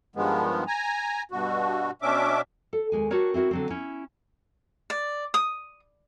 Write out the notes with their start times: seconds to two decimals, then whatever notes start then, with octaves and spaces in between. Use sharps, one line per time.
0.16 G2 D#3 F3 G#3 B3
0.67 G#5 A#5
1.31 G2 B2 F#4
2.02 B2 C#4 D4 E5 D6
2.73 A4
2.92 D#2 G#3 G#5
3.11 D4 F#4 G4 A4 A#4 C#5
3.34 C4 E4 F#4 A#4
3.51 D3 F#3 C4
3.70 C#4 E4
4.90 D5
5.34 D#6